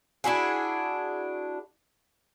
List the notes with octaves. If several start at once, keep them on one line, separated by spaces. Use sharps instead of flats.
D4 E4 F#4 G#4